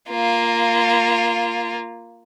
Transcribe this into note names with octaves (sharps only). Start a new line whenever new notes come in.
A#3 F4